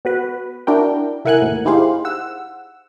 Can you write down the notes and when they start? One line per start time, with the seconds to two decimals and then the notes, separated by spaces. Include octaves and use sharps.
0.05 B3 F#4 B4
0.67 D4 E4 F#4 A#4 G5
1.25 C2 E4 A#4 F#5 G#5 F#6
1.42 D#2 A2
1.65 D#4 E4 G4 G#4 C5 F5
2.05 F#5 E6